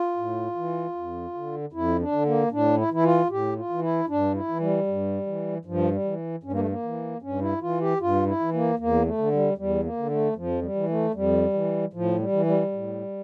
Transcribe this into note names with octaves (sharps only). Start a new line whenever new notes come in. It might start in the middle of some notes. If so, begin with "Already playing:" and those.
Already playing: F4
A2
E3
F2
D3
F2 E4
D4
D3
A#3
A2 D4
E4
E3 E4
F4
A2 G4
F4
E3
E4
G2 D4
E4
E3
G3
G2
E3
G2 F3
G3
E3
G2 C#4
A#3
A3
A#3
E3
G2 C#4
E4
E3 F4
G4
G2 F4
E4
E3
A#3
E2 A#3
A3
D3
G3
E2 G3
A#3
D3
A3
F2 F3
G3
E3
A3
F2 G3
E3
A2 F3
G3
E3
G3
A2